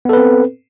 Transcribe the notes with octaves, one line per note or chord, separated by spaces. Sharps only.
B3 C4 A4 B4